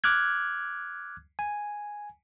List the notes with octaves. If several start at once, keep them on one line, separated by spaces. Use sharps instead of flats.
D6 F6 F#6 G#6
G#5